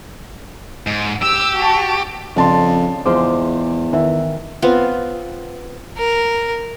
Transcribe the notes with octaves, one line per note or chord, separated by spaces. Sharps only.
G#2
G4 E6
F#4 A5
F2 C#3 D4 A5 C6
E2 F3 G#3 C5 D6
D#3 E3 E5
B3 C4 F4
A#4